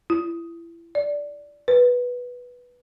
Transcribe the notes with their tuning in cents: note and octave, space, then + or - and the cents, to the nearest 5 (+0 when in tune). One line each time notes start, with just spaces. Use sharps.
E4 +30
D5 -10
B4 -5